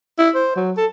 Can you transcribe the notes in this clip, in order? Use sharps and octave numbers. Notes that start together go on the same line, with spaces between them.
E4
C5
F#3
A4